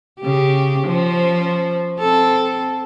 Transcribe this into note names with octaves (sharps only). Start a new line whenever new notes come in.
C#3 G4
F3 C#4 C5
C4 A4